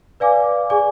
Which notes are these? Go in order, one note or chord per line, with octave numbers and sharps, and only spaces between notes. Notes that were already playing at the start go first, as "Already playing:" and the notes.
B4 D5 F5 G#5 D6
G#4 D5 G#5 D6